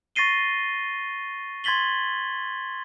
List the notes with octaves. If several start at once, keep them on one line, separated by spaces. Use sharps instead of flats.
C#6 A6 A#6 C7 D#7 G7
C6 G#6 A6 B6 F#7 G7